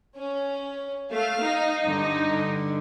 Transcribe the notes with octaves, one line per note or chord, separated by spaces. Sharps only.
C#4
A3 F5
D#4
G2 D3